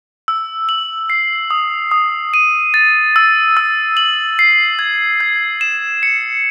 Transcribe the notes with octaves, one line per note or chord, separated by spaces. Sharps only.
E6
F#7
C7
D#6
D#6
D#7
A6
E6
E6
F#7
C7
G#6
G#6
E7
C#7